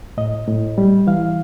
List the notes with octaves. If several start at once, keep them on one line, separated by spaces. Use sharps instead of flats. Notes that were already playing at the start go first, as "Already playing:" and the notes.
A2 D#5
A2
G3
E3 F5